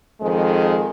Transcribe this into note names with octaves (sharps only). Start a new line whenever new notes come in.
F2 D#3 G#3